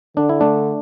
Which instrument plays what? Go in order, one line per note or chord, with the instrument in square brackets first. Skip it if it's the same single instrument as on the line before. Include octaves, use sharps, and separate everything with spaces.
[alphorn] D3 [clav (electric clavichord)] D4
[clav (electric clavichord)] E4
A3 D4